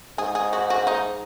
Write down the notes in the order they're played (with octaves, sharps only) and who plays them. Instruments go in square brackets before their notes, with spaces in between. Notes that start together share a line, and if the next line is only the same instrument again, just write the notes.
[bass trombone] G#2 [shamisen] G#4
[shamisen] G#4
F#4
F#4
D#4